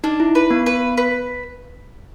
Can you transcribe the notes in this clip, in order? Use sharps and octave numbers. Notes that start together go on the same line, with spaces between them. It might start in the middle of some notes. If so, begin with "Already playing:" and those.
D4 D#4
E4
B4
B3
B4
B4